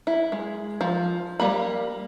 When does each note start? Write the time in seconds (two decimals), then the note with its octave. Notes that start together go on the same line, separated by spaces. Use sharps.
0.07 E4
0.32 G#3
0.81 F3
1.40 G3 A#3 B5